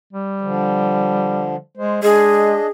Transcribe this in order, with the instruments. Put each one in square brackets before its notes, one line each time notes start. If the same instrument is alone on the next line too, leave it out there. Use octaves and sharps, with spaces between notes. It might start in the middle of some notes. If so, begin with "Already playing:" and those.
[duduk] G3
[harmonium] D3 F3
[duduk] G#3 [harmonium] C5
[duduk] G#3 [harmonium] D4 D#5 [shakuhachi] G#4